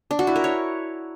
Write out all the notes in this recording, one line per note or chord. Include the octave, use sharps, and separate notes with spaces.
D4
F#4
E4
A#4
C#5